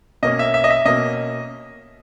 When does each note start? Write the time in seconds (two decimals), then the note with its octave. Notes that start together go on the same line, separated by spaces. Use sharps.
0.23 B2 A#3 C#4 D#5
0.39 E5
0.54 E5
0.64 D#5
0.70 E5
0.86 B2 A#3 C#4 D#5